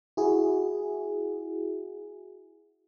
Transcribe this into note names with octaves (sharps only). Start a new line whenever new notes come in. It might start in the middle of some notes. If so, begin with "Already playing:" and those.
E4 F#4 G#4